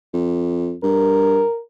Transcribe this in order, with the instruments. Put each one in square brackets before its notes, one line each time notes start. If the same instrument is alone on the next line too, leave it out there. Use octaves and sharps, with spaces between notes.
[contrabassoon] F2
[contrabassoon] G2 [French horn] A#4